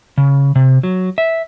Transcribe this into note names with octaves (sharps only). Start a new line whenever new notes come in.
C#3
C3
F#3
E5